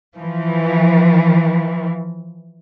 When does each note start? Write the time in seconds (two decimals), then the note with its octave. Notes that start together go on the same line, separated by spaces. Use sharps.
0.16 E3 F3